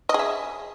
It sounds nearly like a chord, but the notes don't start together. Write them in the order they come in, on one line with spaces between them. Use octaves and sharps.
D#5 G#4 E5